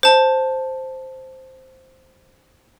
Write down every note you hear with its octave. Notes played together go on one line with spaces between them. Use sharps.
C5 A5